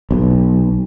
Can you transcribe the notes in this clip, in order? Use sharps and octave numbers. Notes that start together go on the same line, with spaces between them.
B1